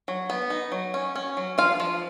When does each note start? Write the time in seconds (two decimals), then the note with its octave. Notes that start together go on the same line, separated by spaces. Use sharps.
0.08 F#3
0.30 B3
0.50 D#4
0.72 F#3
0.94 C#4
1.16 C#4
1.37 F#3
1.58 F3 F4 F5
1.80 F3